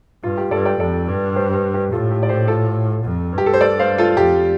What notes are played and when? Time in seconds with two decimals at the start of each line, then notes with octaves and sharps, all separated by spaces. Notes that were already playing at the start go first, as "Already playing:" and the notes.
0.24 G2 F4
0.38 G4
0.51 G2 A4 D5
0.65 D5 G5
0.80 F2 A4 D5
1.08 G2
1.36 G4 C5
1.74 G4
1.92 A2 F4 A4
2.11 G4
2.23 D5
2.29 G4 C5
2.48 F4 A4
3.04 F2
3.32 G2
3.38 G4
3.46 A4
3.53 C5
3.61 A4 D5
3.79 C5 F5
3.98 F4 A4
4.17 F2 G4